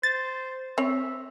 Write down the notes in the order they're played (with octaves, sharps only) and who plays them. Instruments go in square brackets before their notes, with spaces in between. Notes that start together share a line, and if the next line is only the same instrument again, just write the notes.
[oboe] C5 [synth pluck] A6
[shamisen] C4 C#5 [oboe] E5